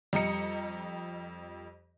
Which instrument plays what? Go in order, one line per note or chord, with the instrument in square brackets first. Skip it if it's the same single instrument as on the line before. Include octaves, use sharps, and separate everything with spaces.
[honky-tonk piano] F2 G3 D#5 A#5 C#7